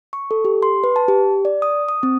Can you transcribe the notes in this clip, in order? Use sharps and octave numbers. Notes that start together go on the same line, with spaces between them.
C#6
A4
G4
C6
B4
A5
G4
D5
D#6
D#6
C4